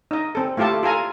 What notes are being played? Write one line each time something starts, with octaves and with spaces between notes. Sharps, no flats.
D#4 D#5
C4 A4
A3 E4 F4 G4 A4 A5
F4 A4 G#5 A#5